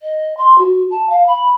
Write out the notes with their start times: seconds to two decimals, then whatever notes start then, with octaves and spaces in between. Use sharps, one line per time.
0.01 D#5
0.37 C6
0.58 F#4
0.91 A5
1.10 F5
1.27 B5